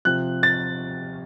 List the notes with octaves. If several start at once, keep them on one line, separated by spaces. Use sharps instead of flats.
C3 F3 F#6
A6